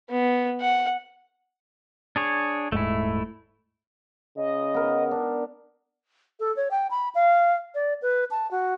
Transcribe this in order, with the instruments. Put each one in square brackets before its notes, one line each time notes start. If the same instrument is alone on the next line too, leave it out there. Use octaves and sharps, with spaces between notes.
[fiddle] B3
F#5
[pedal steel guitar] D4 G#4 C#5
[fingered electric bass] D#1 G#2 [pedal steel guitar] A3 E4
[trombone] C#3 [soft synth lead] D#5
[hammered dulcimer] B3 A#4
D4
[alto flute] A4
C#5
G5
B5
F5
D5
B4
A5
F#4